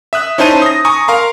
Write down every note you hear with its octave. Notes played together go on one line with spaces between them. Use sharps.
E5 D#6 F#6
C#4 D#4 E4 C5 A5 D#7
D#6 A#6
G#5 A#5 C#6 D#6
A#4 F5 A#5 C6